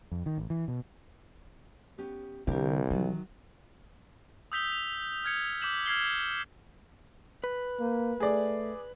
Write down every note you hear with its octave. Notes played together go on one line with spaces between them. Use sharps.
F2
D#3
A1
E3
B2
B3 C#4 G4
C2 D3 G4 A#4
D#3 E3 F#3
D#6 E6 G6 B6 F7 G7
F7
F6 G#6 C#7
D6 G6 B6 E7 F#7
F6 G#6 C7 G7
B4
A#3
A3 G#4 D5